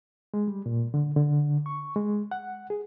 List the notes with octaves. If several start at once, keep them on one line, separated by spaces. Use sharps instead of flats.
G#3
G3
A#2
D3
D3
C#6
G#3
F#5
G#4